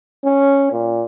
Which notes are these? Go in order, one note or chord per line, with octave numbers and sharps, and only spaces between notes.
C#4
A#2